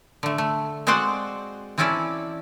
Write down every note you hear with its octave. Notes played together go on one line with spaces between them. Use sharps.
D3 A3
A3
G#3 C4 F#4 C5 D5 F#5
E3 C4 C#4 E4 A4 D5